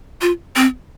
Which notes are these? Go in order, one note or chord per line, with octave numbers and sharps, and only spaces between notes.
F4
C4